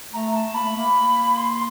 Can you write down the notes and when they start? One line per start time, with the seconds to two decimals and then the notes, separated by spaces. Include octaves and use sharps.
0.13 A3 A#5
0.34 A5
0.54 A#3 B5
0.65 A3
0.76 A#3
1.37 C6